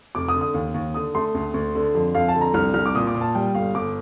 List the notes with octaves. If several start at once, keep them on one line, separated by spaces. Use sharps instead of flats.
F1 D6
D#6
D3
D#6
D#2
D#2
D3 D#6
A3 C6
D2
D2
D3
F2
F2 F5
A5
D3
A#5
C2 F6
C2 F6
D6
A#2 D#6
D6
A#2
A5
G3 G5
G1 F5
G1 D6